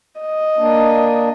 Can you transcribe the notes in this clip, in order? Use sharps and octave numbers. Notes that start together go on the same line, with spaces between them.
D#5
A#3 D4